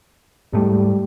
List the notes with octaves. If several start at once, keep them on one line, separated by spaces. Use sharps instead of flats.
G#2 G3 A3